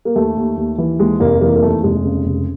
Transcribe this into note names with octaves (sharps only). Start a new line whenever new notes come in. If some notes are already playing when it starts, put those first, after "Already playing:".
A#3
D#2 A3
D#2
D#2
E3
D#2 G#3
F1 A#3
E3 A#3
A#3
D#2 A3
F1 G#3
C#3
F1